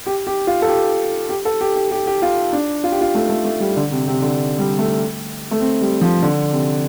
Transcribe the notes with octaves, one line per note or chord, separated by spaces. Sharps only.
G4
G4
F4
A4
G4
G4
A4
G4
G4
G4
G4
F4
D4
F4
G4
F4
A3
A3
A3
G3
D3
C3
C3
D3
G3
A3
A3
C4
G3
F3
D3
C3